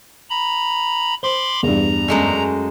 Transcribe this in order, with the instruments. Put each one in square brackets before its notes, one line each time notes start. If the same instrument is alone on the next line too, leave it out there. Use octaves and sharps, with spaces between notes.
[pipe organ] A#5 B5
[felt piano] C5 [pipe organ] B5 C6 D6
[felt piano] E2 G2 [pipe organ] A#5
[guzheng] F#2 G#3 A3